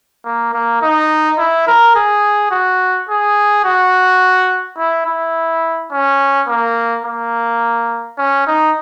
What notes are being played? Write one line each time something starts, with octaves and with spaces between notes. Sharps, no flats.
A#3
A#3
D#4
E4
A#4
G#4
F#4
G#4
F#4
E4
E4
C#4
A#3
A#3
C#4
D#4